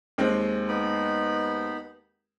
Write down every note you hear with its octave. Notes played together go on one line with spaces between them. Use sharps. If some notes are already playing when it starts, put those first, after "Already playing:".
D#2 G#3 C4
B3 D#4 B5